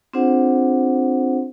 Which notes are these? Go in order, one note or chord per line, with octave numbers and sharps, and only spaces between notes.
C4 D4 F4 G#4 C5 F#5